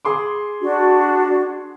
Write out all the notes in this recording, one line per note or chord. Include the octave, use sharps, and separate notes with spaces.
G#4 C6 D6
D4 F#4